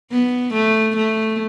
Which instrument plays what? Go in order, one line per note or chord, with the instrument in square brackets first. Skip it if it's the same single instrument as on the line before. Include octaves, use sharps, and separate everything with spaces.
[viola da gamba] B3
A3
A3